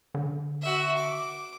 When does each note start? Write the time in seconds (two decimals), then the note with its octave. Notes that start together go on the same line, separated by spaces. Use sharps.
0.14 D3
0.62 F#4 E5
0.97 D6